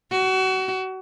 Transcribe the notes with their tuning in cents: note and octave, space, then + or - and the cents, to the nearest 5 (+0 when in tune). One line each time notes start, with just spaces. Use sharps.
F#4 +30